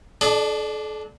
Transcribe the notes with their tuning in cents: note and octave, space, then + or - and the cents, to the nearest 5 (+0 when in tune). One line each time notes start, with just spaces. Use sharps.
D4 +0 A4 -40 D#5 -45